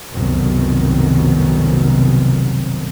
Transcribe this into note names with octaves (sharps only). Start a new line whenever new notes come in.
F1 C2 F#2 B2 D#3